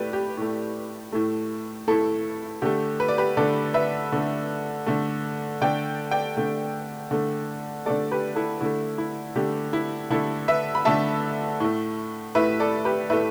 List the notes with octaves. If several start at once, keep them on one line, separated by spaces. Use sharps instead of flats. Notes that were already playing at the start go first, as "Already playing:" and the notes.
Already playing: A2 A3 G4 B4 D5
G4
A2 A3
A2 A3
A2 A3 E4 A4
D3 A3 G4
B4
D5
G4 B4
D3 A3 A4 D5
B4 E5
D3 A3
D3 A3
D3 A3 D5 G5
D5 G5
D3 A3
D3 A3
D3 A3 A4 D5
G4 B4
E4 A4
D3 A3 E4
E4
D3 A3 G4
E4
D3 A3 E4 A4
B4 E5
B5
D3 A3 E5 A5
A2 A3
A2 A3 B4 E5
A4 D5
G4 B4
A2 A3 B4 E5